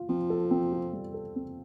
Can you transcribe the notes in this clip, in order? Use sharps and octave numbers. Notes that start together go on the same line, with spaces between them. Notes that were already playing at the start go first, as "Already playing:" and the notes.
Already playing: F4
F3 C4
A4
C4
F4
G3
A4
C4